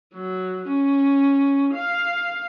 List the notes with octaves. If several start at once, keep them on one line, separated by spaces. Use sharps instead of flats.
F#3
C#4
F5